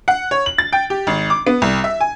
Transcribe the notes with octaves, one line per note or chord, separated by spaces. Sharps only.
F#5
C#5
F#7
A6
G5
G4
G#1
D6
B3
C2
E5
G#5